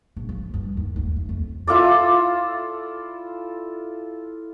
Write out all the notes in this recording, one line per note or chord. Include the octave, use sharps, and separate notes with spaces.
A#1
F3
G2
D#2
D#2
A3
F2
E4 F4 A4 D5